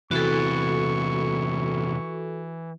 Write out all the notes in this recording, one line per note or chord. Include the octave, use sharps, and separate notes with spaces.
E2 C3 E3 F#4 A4 C#6